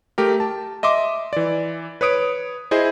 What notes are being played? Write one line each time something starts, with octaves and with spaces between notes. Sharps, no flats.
A3 G4 A#4
A5
D#5 E5 C6 D6
E3 D5
B4 C#5 D#6 D7
E4 G#4 C5 D#5